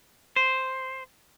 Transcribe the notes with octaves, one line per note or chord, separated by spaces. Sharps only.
C5